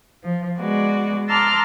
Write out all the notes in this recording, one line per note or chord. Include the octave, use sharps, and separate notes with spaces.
F3
G#3 B3 F#4 D5
A5 A#5 C6 D6 E6 F6